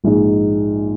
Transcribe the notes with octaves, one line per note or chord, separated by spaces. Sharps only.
A#1 G#2 G#3 D#4